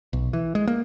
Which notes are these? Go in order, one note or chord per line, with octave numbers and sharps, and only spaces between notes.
B1
E3
G#3
A#3